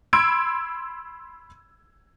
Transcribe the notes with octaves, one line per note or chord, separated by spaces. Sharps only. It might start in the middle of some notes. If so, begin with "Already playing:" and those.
B5 C6 E6 G#6 D7